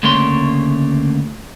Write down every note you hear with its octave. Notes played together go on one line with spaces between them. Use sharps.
D2 C#3 A3 A#3 C#5 C6